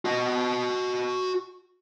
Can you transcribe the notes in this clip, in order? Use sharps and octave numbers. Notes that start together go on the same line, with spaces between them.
F#4 D#5